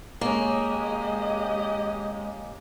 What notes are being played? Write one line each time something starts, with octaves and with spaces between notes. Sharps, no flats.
G#3 A#3 C#4 G4 D#5